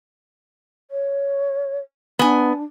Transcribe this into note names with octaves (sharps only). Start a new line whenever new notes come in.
C#5
B3 D4 G#5